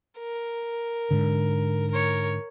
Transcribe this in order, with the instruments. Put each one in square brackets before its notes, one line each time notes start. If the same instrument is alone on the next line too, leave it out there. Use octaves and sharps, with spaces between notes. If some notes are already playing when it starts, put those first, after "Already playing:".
[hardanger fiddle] A#4
[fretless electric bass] G#2 D3
[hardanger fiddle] A#4 C#5